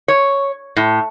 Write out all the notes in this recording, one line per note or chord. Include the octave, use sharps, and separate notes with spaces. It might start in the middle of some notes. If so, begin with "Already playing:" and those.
C#5
A2